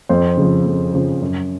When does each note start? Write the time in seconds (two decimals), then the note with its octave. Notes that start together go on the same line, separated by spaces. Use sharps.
0.09 F2 C5
0.37 C#3 F3
0.66 F2
0.94 C#3 F3
1.22 F#2